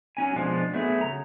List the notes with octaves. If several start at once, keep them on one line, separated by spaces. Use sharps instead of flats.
F#3 C#4 G#5
B2 F3 G#3 D4 F4
F#3 A3 B3 F#4 G#4
C#3 A#5